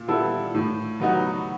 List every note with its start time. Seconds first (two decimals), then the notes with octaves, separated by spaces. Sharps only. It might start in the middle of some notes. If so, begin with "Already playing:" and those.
Already playing: A#2
0.08 G3 B3 E4 A4
0.54 A2
1.00 F#3 B3 D#4 F#4